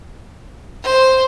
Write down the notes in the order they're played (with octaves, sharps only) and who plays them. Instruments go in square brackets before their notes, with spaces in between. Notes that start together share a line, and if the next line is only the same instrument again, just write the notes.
[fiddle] C5